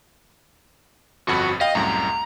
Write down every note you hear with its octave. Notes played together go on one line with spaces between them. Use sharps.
G1 F2 F#4 F#5 B5
D#5 F5 G5
C2 F#2 A2 A#5